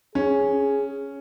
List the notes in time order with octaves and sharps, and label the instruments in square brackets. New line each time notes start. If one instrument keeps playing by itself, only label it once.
[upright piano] C#4 [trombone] G#4